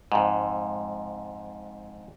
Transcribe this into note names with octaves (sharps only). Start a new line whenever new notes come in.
F2 G#2